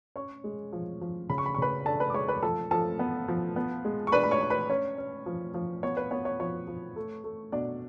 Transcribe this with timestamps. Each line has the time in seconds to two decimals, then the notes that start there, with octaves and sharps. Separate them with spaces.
0.16 C#4 C#5 C#6
0.44 G#3
0.73 F3
1.01 F3
1.30 C#3 B5
1.38 C#6
1.46 B5
1.55 C#6
1.58 C#3 B4 B5
1.86 D4 A4 A5
2.00 B4 B5
2.10 D6
2.14 G#3 C#5 C#6
2.28 B4 B5
2.42 F3 A4 A5
2.71 F3 A4 A5
2.99 B3
3.28 F3
3.56 B3
3.85 G#3
4.07 C#6
4.12 D4 B4 B5
4.23 B5
4.31 C#5 C#6
4.41 D4
4.50 B4 B5
4.69 C#4 C#5
4.98 C#4
5.26 F3
5.54 F3
5.83 B3 C#5
5.97 B4
6.11 B3 C#5
6.25 C#5
6.39 F3 C#5
6.67 F3
6.96 A3
7.24 A3
7.52 B2 D4 D5